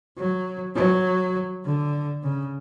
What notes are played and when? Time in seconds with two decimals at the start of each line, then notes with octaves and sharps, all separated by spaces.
0.18 F#3
0.75 F#3
1.65 D3
2.23 C#3